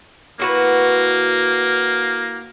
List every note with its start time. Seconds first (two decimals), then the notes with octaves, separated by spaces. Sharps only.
0.40 A#3 E4 F#4 B4